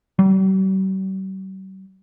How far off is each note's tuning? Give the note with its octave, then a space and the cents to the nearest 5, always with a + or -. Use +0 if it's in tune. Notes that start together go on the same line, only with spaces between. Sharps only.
G3 -45